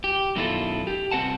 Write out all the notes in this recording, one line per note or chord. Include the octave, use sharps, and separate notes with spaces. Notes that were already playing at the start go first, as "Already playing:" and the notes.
G4
F#2 B2 D#3 E4 F4 A4
G4
C2 C4 B4 F#5 A5